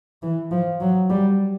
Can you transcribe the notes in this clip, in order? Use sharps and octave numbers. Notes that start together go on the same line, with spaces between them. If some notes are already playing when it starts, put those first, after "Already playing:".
E3
F3
F#3
G3